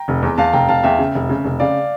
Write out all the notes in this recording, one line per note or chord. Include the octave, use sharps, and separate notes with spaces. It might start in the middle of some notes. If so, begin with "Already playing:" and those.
Already playing: G5 A#5
F1
E2
E2 F5 A5
F1 G5 A#5
F1 F5 A5
E2 E5 G5
C#3
F1
C#3
F1
C#3 D5 F5